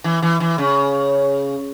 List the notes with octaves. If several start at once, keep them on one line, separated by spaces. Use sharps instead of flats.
E3
E3
E3
C#3